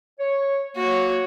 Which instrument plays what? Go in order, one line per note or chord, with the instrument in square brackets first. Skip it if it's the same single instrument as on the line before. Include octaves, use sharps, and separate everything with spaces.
[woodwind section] C#5
[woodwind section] A#3 [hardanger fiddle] F#4 C#5